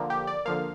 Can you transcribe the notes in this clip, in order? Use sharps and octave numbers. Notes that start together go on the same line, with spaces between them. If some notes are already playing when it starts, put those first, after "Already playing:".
Already playing: D3 F3 A#3
G4
D5
D3 F3 A#3 F5